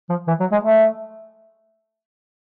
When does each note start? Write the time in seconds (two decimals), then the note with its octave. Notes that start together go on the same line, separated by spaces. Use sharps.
0.10 F3
0.27 E3
0.40 F#3
0.52 G#3
0.64 A3